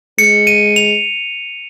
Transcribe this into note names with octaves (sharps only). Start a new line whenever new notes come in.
G#3 C#7
D#7
F7